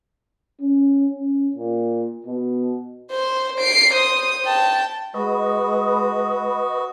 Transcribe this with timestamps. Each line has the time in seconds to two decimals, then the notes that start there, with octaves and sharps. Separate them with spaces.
0.61 C#4
1.18 C#4
1.56 A#2
2.26 B2
3.12 C5
3.58 C7 D7
3.94 C5 D#6
4.45 G5 A5
5.14 G#3 F#4 B4 D#5